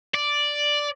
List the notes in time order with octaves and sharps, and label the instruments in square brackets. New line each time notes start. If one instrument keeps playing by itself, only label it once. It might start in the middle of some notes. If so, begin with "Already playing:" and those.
[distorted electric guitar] D5